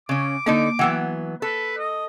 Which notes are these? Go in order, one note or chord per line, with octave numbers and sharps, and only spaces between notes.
C#3 C#4 D6
D3 A#3 D#4 A4
E3 F#3 B3 F#5 G5 E6
A4 B4
D#5